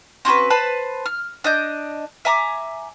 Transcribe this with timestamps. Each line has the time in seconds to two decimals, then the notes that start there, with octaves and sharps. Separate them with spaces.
0.25 C4 C#4 F#4 B4
0.50 B4 C5 A5 B5
1.06 F6
1.44 D4 D#5 G6
2.25 E5 G#5 A#5 D6